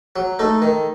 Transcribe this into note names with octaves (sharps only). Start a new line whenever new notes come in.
F#3
A3 D#4
D#3